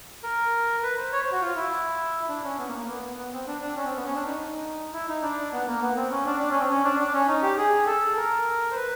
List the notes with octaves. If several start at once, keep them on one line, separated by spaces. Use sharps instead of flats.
A#4
B4
C5
C#5
C5
F#4
F4
E4
D4
C#4
B3
A#3
A#3
B3
B3
C4
D4
D4
C#4
C4
B3
C#4
D4
D#4
E4
D#4
D4
B3
A#3
B3
C4
C#4
D4
D4
C#4
C4
C#4
D4
D4
C#4
D#4
G4
G#4
A4
A#4
C5
B4